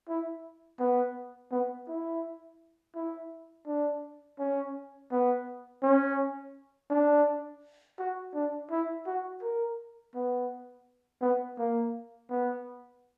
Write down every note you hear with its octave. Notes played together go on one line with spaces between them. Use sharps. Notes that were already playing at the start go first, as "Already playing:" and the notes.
E4
B3
B3
E4
E4
D4
C#4
B3
C#4
D4
F#4
D4
E4
F#4
A#4
B3
B3
A#3
B3